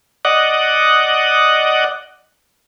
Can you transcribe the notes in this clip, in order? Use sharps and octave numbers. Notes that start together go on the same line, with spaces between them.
D5 D#5 F#5